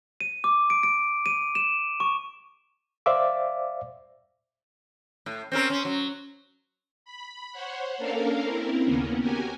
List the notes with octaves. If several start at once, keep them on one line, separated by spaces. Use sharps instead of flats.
D#7
D6
D7
D7
D#7
E7
C#6
C5 D5 E5 F5 D6
A2
C4 C#4 A#4
C#4
F#3
B5
C5 C#5 F#5
A#3 C#4 D4 A4 A#4 F5
C4 E4 A#4
D#2 C#3 A#3 B3 C#4
F#4 G4 A#4 G#5